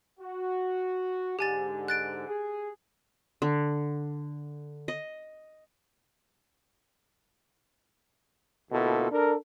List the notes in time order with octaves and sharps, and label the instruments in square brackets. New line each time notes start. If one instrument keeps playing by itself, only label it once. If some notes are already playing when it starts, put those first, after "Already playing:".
[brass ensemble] F#4
[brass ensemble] G#2 D3 [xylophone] G4 G#5 A6
[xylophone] F#6 A6 D7
[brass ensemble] G#4
[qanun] D3
D#5
[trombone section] D2 B2 A#3 E4 F4 A4
D4 A4 A#4